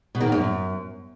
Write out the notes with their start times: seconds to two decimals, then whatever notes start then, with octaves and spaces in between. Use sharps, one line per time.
0.15 B2
0.20 D#3
0.26 A#2
0.32 F#2